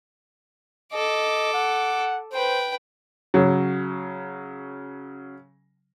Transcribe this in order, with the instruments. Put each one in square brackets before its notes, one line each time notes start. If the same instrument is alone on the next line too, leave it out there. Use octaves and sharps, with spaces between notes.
[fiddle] A4 D6 [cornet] D#5
[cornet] F#5
[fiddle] B4 G5 [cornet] C5
[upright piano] C#3 F#3